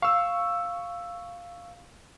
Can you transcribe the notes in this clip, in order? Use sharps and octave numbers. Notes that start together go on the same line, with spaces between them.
F5 C#6 E6